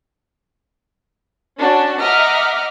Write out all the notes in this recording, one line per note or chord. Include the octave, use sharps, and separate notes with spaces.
C#4 D4 F#4 A5
D#5 E5 F#5 A#5 D6 F6